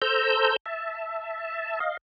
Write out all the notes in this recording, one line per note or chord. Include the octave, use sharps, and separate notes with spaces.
A4 C5 A#5 E6 G6
E5 A5
D#5 F5